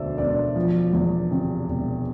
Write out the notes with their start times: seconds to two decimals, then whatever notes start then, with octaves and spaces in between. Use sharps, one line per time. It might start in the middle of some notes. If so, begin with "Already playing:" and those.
Already playing: E1 D2 D3 C5 D5 E5
0.18 E1 D5
0.56 F3
0.93 E2
1.31 C3
1.68 E1